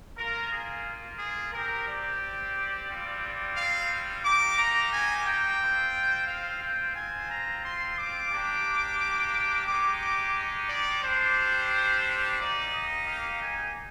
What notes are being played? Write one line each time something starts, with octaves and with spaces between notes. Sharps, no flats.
A#3 F4 A#4
G#4
G#4
C4 G4 A#4
D5
G3 C4 F4
F5
A#3 D#4 G4 D6
A#5
G#5
G5
C4 F4
F5
G5
C4 F4 G#5
A#5
C6
D6
A#3 D4 G4
G#3 D#4 G4 D6
D6
D5
G3 D4 G4 C5
A#3 D#4 G4 D5
D#5
F5
G#5